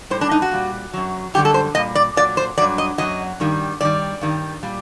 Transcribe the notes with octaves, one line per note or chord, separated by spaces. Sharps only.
A2 G3 C5
D4
D#4
F#4
A#2 G3
F#2 F#3
F#2 D3 G3 G4
A4
C5
A#2 G3 D#5
D5
A#2 F#3 D5
C5
G2 F#3 D5
D#5
F#2 D#3 F#3 D#5
G2 D#3 G3
G2 D#3 G3 D5
G2 D#3 G3
A#2 G3